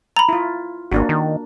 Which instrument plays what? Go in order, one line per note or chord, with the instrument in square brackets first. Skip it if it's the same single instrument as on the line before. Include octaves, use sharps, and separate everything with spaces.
[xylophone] A#5 B5
[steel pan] E4 F4
[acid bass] G#1 [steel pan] A#3 D4 F#4
[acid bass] D#3